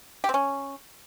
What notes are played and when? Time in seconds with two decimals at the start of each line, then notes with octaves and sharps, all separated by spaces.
0.24 G4
0.29 C4
0.34 C#4